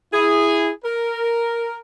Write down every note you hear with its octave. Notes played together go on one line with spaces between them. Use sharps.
E4 G#4
A#4